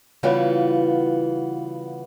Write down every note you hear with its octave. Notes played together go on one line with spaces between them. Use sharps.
C#3 E3 G3 B3 F4 F#4